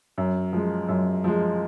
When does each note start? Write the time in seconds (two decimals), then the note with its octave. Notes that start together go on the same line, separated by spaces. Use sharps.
0.18 F#2
0.53 F3 G#3
0.88 F#2
1.24 F3 G#3